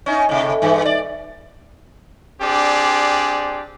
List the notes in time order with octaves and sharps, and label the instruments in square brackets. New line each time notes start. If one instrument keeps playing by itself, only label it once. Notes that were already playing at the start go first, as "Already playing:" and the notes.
[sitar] C#4 D#4
A2 C3
G2 E3
D5
[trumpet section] C4 D4 G4 G#4 D5